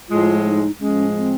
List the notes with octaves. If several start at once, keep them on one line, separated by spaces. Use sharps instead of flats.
A2 F3 G#3 F4
D#4
A2 F3 G#3 C#4
C4